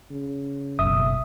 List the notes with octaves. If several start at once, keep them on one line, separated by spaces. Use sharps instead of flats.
C#3
F#1 B1 E5 D#6